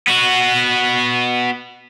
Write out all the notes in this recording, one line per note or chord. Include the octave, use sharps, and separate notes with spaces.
B3 F#4